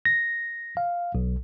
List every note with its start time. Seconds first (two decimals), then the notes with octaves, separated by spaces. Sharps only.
0.05 A#6
0.77 F5
1.15 B1